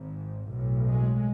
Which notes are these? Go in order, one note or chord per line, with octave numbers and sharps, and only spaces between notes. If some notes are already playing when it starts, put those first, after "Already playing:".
Already playing: G#1 G#2
B1 A2
G#3